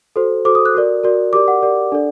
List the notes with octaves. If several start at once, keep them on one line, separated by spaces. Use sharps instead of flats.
F#4 A4 C5
F#4 A4 C5 D6
D#6
F#6
F#4 A#4 D5
F#4 A#4 D5
G4 A#4 D5 D6
F#5
G4 A#4 D5
D4 A4 D5